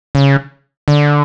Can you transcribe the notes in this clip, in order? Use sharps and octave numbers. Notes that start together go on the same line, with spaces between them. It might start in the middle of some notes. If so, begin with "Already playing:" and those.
C#3
D3